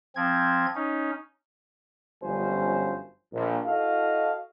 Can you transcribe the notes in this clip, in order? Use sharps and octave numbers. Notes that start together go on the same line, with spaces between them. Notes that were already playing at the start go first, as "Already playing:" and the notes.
F3 C4 G#6
C#4 D#4
G1 F#2 F3 C#4 C5 G#5
A#1
E4 F#4 A4 D#5 F5